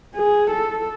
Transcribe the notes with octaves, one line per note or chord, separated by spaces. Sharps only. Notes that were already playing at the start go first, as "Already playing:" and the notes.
G#4
A4